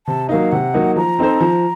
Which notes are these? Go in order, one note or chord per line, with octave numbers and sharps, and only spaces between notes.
C3 A5
F#3 A#3 D#4 F5
C3 F#5
F#3 A#3 D#4
F3 A#5
C4 D#4 A4 C5
F3